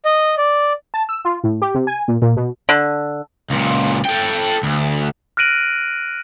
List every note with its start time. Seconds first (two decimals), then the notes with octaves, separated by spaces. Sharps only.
0.05 D#5
0.38 D5
0.94 A5
1.09 E6
1.25 F4
1.44 A2
1.62 G4
1.74 C3
1.87 G#5
2.08 A#2
2.22 A#2
2.36 B2
2.69 D3
3.50 C#2 A#2
4.05 A4 G5
4.63 D2
5.37 F6 F#6 A#6 D7 D#7 F#7